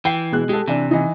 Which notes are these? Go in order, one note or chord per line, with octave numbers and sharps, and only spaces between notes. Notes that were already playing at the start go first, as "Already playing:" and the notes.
E3 G5 C7
B2 G#3 F#6
G#3 G4 A4
C3 E3 D4
E3 D#4